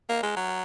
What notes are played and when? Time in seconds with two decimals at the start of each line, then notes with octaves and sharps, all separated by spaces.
0.09 A#3
0.23 G#3
0.36 F#3